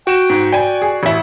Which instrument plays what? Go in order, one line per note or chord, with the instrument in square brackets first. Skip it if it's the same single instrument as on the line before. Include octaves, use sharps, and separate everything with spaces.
[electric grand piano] F#4 E7 [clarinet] G5
[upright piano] G#2
[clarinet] D5 [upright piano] G5 G#5
[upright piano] G#4
A1 E4